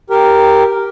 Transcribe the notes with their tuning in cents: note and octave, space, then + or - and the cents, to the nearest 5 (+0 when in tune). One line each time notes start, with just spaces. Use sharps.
G4 +0 A#4 +0 G5 +10